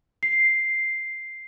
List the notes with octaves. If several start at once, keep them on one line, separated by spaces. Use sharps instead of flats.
C7